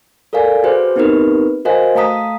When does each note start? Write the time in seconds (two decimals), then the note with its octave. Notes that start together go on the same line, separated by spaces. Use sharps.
0.33 A4 A#4 D5 F5 G#5
0.64 F#4 G#4 B4 C5 G5
0.96 B3 C4 D#4 G4 A#4 B4
1.65 F#4 A#4 C5 D#5 F5 G#5
1.95 A3 F5 A5 A#5 D#6 B6